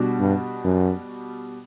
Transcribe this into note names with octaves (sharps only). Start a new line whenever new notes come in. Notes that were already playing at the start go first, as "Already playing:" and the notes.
Already playing: B2 G3 D4 F#4
G2
F#2